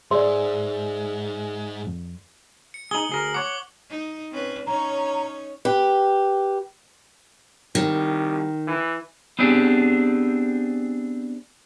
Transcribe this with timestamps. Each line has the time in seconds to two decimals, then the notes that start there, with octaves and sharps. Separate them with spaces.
0.11 G#2 G#4 C5 D5 E5 C6
1.87 F2
2.74 C#7
2.91 D#4 G#4 F#7 G7
3.09 D2 G#4 A#4
3.34 C#5 F#5 D6
3.89 D#4
4.31 C4 C#4 B4
4.67 C#4 D#4 C#5 A#5
5.65 G4 B4
7.75 C2 D#3
8.67 E3
9.39 B3 C4 D4 G4 G#4